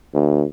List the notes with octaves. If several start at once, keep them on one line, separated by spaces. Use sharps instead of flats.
D2